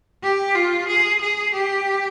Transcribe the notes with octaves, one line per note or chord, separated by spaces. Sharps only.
G4
F4
G#4
G#4
G4